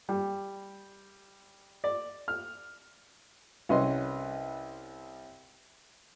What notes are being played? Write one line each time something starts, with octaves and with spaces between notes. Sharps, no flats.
G3
D5
F6
C2 C#4 B4 D#5 C6